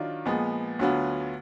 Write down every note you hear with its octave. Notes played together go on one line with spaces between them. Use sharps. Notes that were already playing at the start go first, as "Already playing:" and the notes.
Already playing: D#3 F#3 D4 F4
A#2 F3 G#3 B3
D2 D3 F#3 B3 F4